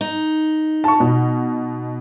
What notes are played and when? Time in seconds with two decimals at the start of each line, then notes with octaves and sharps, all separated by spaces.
0.01 D#4
0.84 A5 C#6
1.00 B2